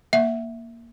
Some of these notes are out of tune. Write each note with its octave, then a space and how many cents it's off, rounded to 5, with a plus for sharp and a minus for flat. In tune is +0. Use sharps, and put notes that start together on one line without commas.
A#3 +0 E5 +0